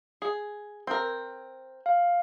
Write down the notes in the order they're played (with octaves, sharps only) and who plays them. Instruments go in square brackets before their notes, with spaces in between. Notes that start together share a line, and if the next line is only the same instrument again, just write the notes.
[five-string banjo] G#4
C4 A#4
[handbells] F5